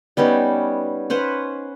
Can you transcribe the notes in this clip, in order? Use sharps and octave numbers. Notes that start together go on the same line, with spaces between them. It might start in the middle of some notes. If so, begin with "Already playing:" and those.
G3 B3 C#4 D#4
C#4 B4 C5 F#5